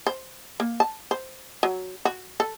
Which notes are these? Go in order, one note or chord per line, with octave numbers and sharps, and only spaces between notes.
C5
A#3
A5
C5
F#3
F#4
A4